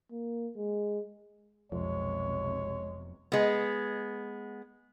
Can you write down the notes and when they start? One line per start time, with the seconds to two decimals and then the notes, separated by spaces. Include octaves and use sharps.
0.11 A#3
0.56 G#3
1.72 F1 B1 F2 C3 G#3 C#5
3.32 G#3 B3